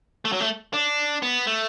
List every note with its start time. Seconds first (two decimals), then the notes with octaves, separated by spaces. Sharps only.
0.25 A3
0.32 F#3
0.40 A3
0.74 D4
1.22 B3
1.47 A3